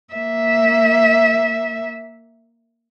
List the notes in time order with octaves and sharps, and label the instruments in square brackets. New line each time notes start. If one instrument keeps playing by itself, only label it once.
[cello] A#3 E5